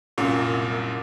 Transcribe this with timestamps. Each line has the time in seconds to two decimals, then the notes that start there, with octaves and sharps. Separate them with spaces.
0.18 C2 F#2 A#2